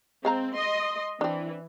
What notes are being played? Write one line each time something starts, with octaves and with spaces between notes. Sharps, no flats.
G#3 C4 F5 A#5
D#5 C6
E3 C4 D4